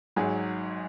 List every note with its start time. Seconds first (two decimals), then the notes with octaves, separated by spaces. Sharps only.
0.16 G#1 G#2 F#3 G#4